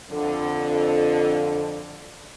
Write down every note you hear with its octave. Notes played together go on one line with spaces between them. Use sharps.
F2 D3